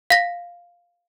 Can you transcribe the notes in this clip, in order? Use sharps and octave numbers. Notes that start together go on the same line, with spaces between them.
F5 A#6